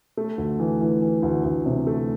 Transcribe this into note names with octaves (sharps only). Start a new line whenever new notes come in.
A3
D2
E3
E3
E3
D2
D2
C3
A3